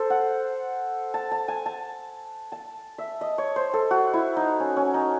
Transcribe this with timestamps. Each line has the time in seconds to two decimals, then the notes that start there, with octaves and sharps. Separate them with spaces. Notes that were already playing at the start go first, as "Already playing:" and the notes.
Already playing: A4 C5
0.10 F#5
1.14 A5
1.31 A5
1.48 G#5
1.66 A5
2.52 A5
2.98 E5
3.21 D#5
3.38 C#5
3.56 C5
3.73 A4
3.91 F#4
4.13 E4
4.37 D#4
4.60 C#4
4.77 C#4
4.94 D#4